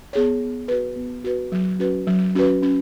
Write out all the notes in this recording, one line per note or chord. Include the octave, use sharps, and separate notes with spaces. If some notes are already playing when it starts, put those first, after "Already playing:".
B3 G#4 C#5
B3
F#4 B4
B3
F#4 B4
F#3
C#4 F#4 B4
F#3
C#4 F#4 B4
C#4